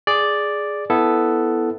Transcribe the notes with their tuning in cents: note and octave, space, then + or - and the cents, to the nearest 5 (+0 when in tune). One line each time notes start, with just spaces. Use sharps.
G#4 +0 D5 +0
B3 +0 E4 +0 A4 +0